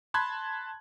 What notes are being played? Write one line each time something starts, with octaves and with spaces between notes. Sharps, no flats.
A5 B5 C6 F#6 G#6